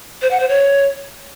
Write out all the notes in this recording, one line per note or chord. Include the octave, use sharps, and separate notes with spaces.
C5
F#5
C5
C#5